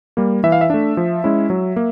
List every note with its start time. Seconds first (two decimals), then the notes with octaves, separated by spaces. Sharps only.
0.17 G3 A#3
0.44 E3 E5
0.52 F5
0.61 E5
0.70 A3 D4
0.97 F3
1.24 G#3 C#4 E4
1.50 F#3
1.76 A#3